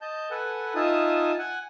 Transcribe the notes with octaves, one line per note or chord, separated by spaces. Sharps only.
D#5 A5 G6
A4 B4 F#5 G#5
D#4 F4 E5 G#5 A5 D#6
F#5 G#5